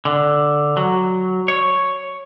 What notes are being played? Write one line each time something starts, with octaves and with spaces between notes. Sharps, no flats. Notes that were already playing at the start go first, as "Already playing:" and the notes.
D3
F#3
C#5